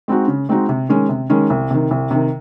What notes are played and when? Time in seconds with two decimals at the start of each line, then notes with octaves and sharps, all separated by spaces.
0.08 G#3 C4 D#4 F#4
0.28 C#3
0.49 G#3 C4 D#4 F#4
0.69 C3
0.89 D#3 G#3 C#4
1.09 C3
1.30 D#3 G#3 C#4
1.50 C2
1.70 C3 D#3
1.91 C2
2.11 C3 D#3